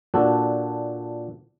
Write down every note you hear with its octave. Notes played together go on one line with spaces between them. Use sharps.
A#2 D4 F#4 A4